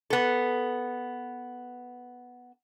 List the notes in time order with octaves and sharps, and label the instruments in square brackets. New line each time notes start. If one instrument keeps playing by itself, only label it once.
[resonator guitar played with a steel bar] B3 A4